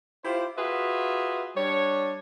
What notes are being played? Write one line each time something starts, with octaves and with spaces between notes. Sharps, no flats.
E4 F4 G4 C5
F4 F#4 G#4 B4 E5
G3 D4 C#5